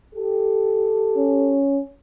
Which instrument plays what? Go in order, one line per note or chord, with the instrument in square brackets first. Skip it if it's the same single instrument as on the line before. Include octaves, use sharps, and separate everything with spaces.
[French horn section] G4 A4
[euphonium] C#4